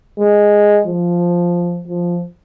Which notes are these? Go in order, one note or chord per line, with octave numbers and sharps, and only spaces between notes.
G#3
F3
F3